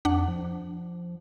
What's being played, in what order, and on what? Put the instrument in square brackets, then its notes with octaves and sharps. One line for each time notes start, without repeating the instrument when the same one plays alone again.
[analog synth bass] F2 [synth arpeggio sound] D4 F#5
[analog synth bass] F3